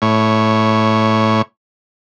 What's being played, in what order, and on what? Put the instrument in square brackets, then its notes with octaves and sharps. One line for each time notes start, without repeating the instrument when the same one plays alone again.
[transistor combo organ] A2 C#5